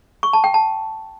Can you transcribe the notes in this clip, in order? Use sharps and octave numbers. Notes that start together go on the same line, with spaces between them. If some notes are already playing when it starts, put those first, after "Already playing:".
C#6
A5
G5
A5